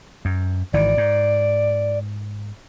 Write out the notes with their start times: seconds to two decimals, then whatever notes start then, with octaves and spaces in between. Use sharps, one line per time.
0.25 F#2
0.73 G#1 D#3 E3 D5
0.97 G#2